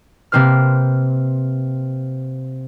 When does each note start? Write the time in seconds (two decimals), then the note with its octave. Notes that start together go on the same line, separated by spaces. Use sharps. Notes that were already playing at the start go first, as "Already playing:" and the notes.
0.32 C3 A#3 C4 B4 F6